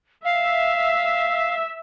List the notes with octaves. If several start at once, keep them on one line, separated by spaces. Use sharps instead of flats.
E5 F5